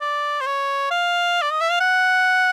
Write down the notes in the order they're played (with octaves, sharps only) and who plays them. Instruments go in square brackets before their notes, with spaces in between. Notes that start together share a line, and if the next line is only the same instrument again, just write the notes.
[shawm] D5
C5
C#5
F5
D5
D#5
E5
F5
F#5